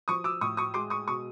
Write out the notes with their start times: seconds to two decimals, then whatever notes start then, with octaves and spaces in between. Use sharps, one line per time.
0.08 F3 C#6 D#6
0.24 D6 E6
0.41 A2 C#6 D#6
0.57 C#6 D#6
0.74 G#3 C6 D6
0.90 C#6 D#6
1.08 B2 C#6 D#6